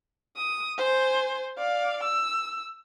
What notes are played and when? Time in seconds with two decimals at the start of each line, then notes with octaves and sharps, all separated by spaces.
0.37 D#6
0.78 C5 G#5
1.58 D5 F5
2.04 E6